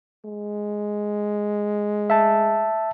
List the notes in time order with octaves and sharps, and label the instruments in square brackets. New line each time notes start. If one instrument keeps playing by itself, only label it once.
[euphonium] G#3
[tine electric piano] E5 A5